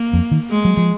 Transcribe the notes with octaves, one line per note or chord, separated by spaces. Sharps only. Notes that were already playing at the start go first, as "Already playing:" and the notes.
Already playing: A#3
F2
D#3
G#3
F#3
F3